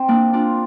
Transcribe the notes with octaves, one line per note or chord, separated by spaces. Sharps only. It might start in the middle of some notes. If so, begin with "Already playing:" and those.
Already playing: C4
A#3 D4
D4 F4